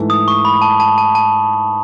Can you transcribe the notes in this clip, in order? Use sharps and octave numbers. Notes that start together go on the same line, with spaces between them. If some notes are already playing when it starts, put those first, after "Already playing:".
Already playing: G#2 E3 A3
D#6
C#6
B5
A5
A5
A5
A5